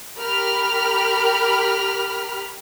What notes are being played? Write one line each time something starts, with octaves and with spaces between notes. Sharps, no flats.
G4 A#4 B5 F6